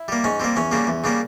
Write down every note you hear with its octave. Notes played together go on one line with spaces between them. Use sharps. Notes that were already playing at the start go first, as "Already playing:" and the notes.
Already playing: E4
G3 A#3
G#2 C#4
G3 A#3 C4
E2 C#4
C#3 G3 A#3
E2
C#3 G3 A#3